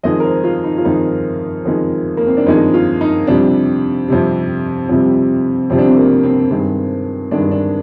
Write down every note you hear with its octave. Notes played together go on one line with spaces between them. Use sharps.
F2 D#3 G#3 D#5
A#4
C5
F4
D#4
F4
F2 D#3 G#3 D#4
F2 D#3 G#3
A#3
C4
D4
F2 D#3 G#3 D#4
F4
D#4
F2 C3 G3 D4
F2 C3 G3
F2 C3 G3
F2 C3 G3 C4
D4
C4
A#3
C4
G2 D#3 G#3 C4
G2 D#3 G#3 D4
D4